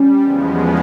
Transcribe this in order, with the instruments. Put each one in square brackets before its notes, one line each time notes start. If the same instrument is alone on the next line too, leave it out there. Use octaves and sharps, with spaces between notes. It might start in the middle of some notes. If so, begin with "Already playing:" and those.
Already playing: [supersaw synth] G3 [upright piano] C#4
[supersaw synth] E2 C#3 F3 G#3 B3